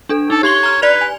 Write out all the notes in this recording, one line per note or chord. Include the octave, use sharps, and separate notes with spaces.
D4 A4
D#4 A4
G4 C#5 C6 G7
A#5 F6
B4 D5 G#6 F7
G#5